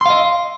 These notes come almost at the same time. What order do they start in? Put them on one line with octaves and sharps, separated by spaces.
C6 F5 D#5